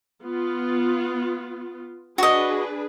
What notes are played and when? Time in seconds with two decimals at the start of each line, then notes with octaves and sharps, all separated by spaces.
0.23 B3 F4
2.18 D4 F#4 G#4 B4 D#5